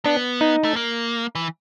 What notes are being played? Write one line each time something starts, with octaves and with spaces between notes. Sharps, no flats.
B3 D4
D#4
A3
A#3
E3